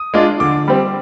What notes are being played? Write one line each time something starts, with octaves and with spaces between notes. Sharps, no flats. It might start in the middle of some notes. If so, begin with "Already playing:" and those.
Already playing: D#6
G#3 D4 F4
D3 D6
G3 C4